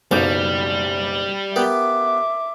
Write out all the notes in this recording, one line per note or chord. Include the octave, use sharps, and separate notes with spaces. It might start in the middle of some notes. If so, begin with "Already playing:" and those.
F#1 B1 G3 D6 G6
B3 G4 A#4 E5 D6